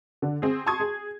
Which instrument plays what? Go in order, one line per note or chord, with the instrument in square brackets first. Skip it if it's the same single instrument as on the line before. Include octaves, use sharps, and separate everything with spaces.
[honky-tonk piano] D3
C4 G#4
A5 C6 C#6 D#6 G#6
G#4